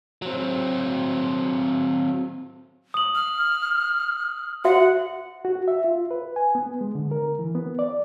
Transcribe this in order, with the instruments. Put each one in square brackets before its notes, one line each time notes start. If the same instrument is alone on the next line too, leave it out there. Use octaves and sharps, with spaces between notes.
[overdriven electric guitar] F#3 C4
[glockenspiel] D#6 F#7
[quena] F6
[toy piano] F#4 E5 [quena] F#5
[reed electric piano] F#4
E5
F4
B4
G#5
B3
G#3
D3
A#4
E3
B3
D5